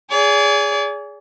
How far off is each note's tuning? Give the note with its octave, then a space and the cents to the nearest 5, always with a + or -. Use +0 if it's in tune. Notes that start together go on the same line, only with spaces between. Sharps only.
G#4 +0 D5 -40